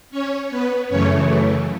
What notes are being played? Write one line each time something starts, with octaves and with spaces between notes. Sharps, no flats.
C#4 C#5
B3 B4
F#2 C#3 E3 A3 C#4 C#5